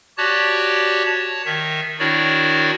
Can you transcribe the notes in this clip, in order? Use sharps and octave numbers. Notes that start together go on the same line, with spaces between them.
F#4 G4 C#5 D5 A5 F#6
C#5 A5
D#3 E5
D#3 D4 E4 F#4 C#5 D5